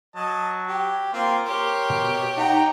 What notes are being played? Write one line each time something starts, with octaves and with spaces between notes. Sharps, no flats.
F#3 D#5 A5
G4
A#3 C4 F4 C5
G4 A#4 C#5 C6
B2
D#4 F#5 G5 A#5